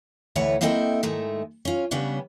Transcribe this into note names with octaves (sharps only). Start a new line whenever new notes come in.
D2 A2 E3 B4 C#5 F#5
A#3 C4 E4 A4 D#5 G5
G#2 D#3 G#3 A3
C#4 F4
C#3 G3 B3 C#4 D4